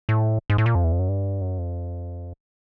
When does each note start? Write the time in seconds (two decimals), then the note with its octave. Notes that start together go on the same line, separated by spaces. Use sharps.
0.09 A2
0.50 G#2
0.58 A2
0.66 A#2
0.75 F2
0.84 E2
0.92 F2
0.99 F#2
1.09 G2
1.41 F#2
1.58 F2